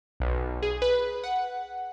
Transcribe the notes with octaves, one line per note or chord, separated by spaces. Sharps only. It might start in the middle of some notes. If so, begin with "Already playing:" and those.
B1
G#4
B4
F#5